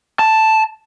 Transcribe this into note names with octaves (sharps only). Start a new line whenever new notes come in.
A5